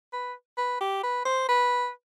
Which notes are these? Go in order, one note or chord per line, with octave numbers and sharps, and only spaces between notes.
B4
B4
G4
B4
C5
B4